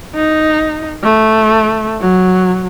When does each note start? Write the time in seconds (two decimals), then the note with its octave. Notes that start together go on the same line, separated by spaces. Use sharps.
0.15 D#4
1.03 A3
2.00 F#3